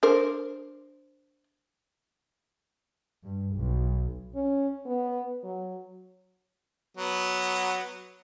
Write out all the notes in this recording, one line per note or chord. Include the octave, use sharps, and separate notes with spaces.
D4 A#4 C5
G2
B1
C#4
B3
F#3
F#3 B3